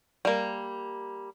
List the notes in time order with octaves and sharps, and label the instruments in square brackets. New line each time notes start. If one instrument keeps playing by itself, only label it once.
[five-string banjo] G3 A#3